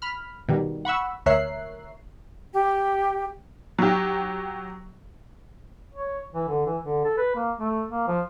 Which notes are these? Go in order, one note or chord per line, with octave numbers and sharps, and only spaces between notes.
B5 F6
B2 D#3 G3
F#5 B5 C#6 E6
D2 A#4 C#5 E5 F#6 C7
G4
F#3 G4
C#5
E3
D3
E3
D3
A4
B4
A#3
A3
A#3
F3